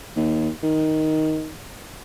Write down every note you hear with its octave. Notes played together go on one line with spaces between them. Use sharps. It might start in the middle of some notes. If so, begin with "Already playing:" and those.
D#2
D#3